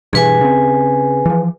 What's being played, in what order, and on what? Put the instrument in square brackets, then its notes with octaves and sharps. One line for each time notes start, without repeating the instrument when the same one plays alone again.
[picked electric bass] G2 B2 E3 [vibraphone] G#4 B4 G#5
[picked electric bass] C#3 C4
E3 F3